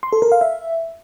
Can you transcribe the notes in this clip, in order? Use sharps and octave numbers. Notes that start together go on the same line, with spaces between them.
C6
A4
A#4
F5
E5